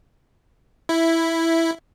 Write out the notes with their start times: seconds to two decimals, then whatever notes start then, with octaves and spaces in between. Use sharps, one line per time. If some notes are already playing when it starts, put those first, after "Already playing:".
0.89 E4